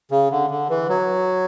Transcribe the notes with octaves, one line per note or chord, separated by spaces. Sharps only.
C#3
D3
D3
E3
F#3